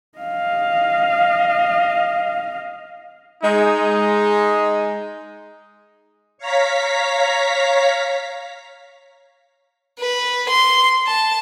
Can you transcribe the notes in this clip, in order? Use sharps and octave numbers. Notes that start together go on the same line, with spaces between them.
D#5 F5
G#3 D#4
C#5 F5 A#5 B6
B4
C6
A5